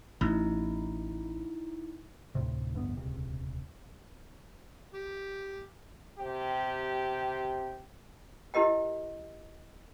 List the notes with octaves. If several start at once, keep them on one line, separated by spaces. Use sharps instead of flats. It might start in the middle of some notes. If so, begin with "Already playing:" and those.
A1 D#4 E4
D2 A2 C3
A1 D2 G2 B3
D#1 C#2 C3
G4
C3 G4
E4 G4 A#4 D#5 G5